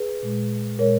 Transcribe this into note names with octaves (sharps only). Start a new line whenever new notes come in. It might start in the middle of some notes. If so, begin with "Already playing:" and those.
Already playing: G#4 B4
A#2 G#3
A#2 G#3 A#4 C#5